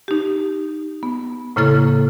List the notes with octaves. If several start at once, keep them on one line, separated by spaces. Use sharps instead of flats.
D#4 G4
B3
A2 C#3 A#3 E4 A4 F6